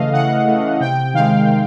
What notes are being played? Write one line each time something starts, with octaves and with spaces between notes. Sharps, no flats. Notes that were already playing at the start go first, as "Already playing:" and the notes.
Already playing: C#3 E3 A3 D#5 F5
C#3 F#5
E3 A3
C3 G5
D#3 G#3 F5
C3